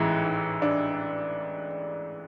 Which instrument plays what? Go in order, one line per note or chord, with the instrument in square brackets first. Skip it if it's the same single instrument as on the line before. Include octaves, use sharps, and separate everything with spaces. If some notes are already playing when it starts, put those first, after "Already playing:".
Already playing: [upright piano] A1 G#2 E3 G#3 E4
D4